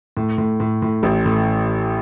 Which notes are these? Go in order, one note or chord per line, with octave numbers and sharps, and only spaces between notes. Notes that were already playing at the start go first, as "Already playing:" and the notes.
A2
A2
A2
A2
A1
A2